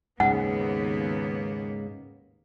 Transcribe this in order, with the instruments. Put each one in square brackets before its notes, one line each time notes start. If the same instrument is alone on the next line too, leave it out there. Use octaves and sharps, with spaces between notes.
[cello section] D#2 A#3 B3 [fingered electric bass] G#2 C#3 [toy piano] F#5